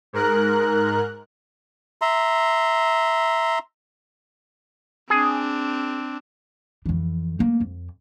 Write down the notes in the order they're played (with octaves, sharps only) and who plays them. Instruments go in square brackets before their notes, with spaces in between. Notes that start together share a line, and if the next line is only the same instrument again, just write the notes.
[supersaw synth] G#2 A#4 F#6
[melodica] E5 A#5 C6
[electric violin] C4 D4 [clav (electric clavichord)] G#4
[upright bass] F2 E3
A3 A#3
F2